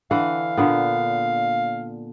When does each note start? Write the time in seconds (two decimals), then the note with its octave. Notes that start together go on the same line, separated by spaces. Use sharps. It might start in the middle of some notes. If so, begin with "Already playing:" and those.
0.11 D3 E3 F5 F#5
0.57 A#2 D3 B3